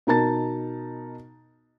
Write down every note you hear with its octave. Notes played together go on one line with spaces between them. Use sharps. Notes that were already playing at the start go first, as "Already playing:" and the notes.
B2 D#4 A#4 A5 A6